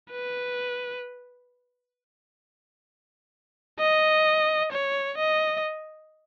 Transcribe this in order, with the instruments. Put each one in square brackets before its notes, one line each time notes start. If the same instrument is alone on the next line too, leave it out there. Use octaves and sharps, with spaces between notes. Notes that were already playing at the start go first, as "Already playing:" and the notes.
[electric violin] B4
D#5
C#5
D#5